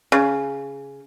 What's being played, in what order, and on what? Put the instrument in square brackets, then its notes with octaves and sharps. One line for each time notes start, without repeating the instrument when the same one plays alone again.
[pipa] C#3